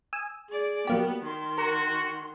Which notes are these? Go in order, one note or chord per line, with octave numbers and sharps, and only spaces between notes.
G#5 D#6 E6
G#4 D5
F#3 A#3 B3 G4
D#3 C6
F#4 A#4